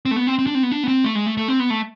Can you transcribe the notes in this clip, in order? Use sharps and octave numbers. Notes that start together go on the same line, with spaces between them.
C4
A3
B3
C4
C4
D4
C4
B3
D4
B3
C4
A3
G#3
A3
A3
C4
B3
A3